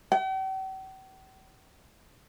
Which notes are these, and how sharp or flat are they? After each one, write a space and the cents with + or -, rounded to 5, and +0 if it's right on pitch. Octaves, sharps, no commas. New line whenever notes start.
G5 -45